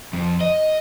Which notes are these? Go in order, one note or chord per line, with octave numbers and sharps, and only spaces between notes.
F2
D#5